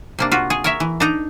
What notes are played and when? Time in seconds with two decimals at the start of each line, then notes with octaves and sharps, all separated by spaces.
0.19 C3 A#3 D4
0.32 F4 F#4
0.50 G#4
0.64 A#4 C#5 E5
0.80 E3
1.00 D4 D#4 A#5